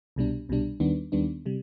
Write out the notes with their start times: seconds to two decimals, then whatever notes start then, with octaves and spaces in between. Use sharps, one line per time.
0.16 C2 B2 G3 D4
0.49 C2 B2 G3 D4
0.80 D#2 D#3 G3 B3 D4
1.12 D#2 D#3 G3 B3 D4
1.46 C3 G3